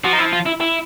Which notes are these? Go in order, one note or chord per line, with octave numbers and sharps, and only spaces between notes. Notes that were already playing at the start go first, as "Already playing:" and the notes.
F3 F#4
D#4
E4
F4
E4
E4